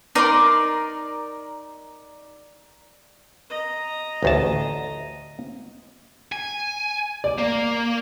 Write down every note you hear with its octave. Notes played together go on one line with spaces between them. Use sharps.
D#4 A#4 D5 C6
D#5 A#5
A1 D2 A5
G#5
D5
A#3